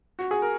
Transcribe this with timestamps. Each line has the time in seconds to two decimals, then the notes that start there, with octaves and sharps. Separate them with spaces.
0.19 F#4
0.31 G#4
0.42 A#4